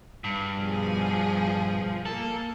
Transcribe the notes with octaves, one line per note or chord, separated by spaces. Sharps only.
G2
B2 F3 G#4
A#3 A4